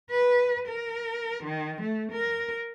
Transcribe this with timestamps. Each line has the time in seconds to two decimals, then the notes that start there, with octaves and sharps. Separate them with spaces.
0.10 B4
0.68 A#4
1.44 D#3
1.82 A3
2.12 A#4